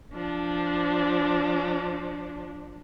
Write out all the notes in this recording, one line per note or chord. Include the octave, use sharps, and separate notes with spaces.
F3 D4